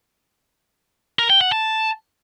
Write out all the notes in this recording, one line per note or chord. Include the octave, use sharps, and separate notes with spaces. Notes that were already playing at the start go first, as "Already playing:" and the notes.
A#4
G5
F#5
A5